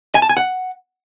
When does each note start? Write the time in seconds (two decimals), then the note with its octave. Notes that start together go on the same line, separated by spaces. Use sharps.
0.15 G#5
0.22 A5
0.29 G#5
0.37 F#5